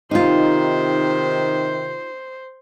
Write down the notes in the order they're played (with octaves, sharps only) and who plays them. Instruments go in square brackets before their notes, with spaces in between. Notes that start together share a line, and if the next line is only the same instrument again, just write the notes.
[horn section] C3 D#3 [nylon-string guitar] D#4 F4 [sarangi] C5